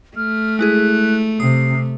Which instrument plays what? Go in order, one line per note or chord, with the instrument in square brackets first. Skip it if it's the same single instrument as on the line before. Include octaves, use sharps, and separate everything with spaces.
[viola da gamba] A3 [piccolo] F6
[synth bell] G#3 E4 G#4 [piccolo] F#6
[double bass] C3 [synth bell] D#6 [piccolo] C7